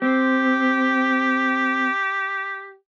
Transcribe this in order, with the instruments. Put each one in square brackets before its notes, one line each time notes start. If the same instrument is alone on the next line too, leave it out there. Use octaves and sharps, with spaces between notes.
[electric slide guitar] C4 [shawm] G4